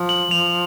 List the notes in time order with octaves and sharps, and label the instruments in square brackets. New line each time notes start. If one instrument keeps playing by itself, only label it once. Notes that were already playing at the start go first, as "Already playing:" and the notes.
Already playing: [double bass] F3
[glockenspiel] F#7
[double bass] F3 [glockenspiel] F7